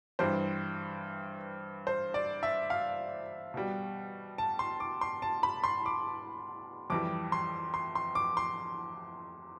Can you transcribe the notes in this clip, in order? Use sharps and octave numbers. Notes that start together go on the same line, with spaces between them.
G2 E3 G3 C5
C5
D5
E5
F5
B2 G3
A5
C6
D6
C6
A5
B5
C6
D6
F2 E3 G3 D6
C6
C6
C6
D6
C6